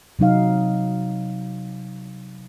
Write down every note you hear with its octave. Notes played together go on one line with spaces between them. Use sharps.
C3 F#3 D#4 F5